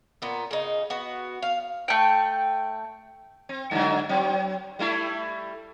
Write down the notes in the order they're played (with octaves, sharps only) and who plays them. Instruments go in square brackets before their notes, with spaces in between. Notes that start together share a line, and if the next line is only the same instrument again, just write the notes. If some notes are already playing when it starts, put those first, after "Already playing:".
[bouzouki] A#2 B3
C#3 D#4
B3 F#4
F5
[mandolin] A3 G5
[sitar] C4
G2 D3 F#3
F#3 C4
G3 A3 E4